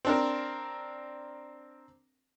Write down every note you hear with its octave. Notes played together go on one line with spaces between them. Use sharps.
C4 D4 A#4